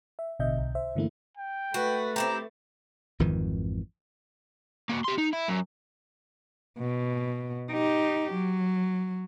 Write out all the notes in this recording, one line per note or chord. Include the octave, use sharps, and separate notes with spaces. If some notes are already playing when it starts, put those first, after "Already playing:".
E5
A1 B2 D3 D#5 E5 G6
B1
C5 E5
G2 D3 E3 A3 A#3 E4
G5
A3 F#4 B4
C4 E4 G4 A#5
G#1 F2 D#3 E3
A#3 F#4
G4 C6
D#4
E4
F#2
B2
D#4 G4
F#3